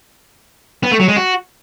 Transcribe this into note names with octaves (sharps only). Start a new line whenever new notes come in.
B3
A3
F#3
G#3
F#4